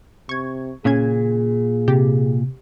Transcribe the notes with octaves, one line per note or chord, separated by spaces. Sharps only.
C3 C#6 G#6
A#2 C#3 C#4 G#4 G#6
C3 G4